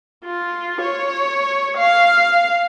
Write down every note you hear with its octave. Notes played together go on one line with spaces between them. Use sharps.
F4
C#5
F5